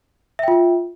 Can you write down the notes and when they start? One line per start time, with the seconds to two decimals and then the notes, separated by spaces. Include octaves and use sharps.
0.39 E5
0.43 G5
0.48 F4